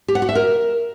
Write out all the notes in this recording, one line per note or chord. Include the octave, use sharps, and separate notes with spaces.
G4
F#5
F#4
E5
A#4